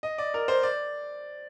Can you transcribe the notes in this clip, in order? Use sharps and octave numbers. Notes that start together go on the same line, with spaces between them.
D#5
D5
A#4
C5
D5